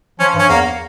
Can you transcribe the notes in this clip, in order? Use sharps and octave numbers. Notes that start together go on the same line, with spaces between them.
F3 C#4
G2 C#4
E2 A#3